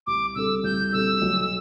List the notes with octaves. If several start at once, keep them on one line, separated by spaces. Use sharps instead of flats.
C2 D6
C3 G3 D4 A4 E6
C2 G6
C3 G3 D4 A4 E6
B1